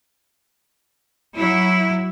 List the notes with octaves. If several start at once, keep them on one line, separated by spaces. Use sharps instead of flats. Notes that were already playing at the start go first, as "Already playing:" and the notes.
F#3 E4